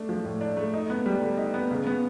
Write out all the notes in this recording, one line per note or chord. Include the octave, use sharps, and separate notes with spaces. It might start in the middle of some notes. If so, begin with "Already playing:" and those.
Already playing: A3 D4
F3
A2
D4
A3
D#4
B3
G3
D3
D#4
B3
C#3
B3